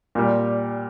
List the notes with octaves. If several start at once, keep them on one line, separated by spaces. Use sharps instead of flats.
A#2 G3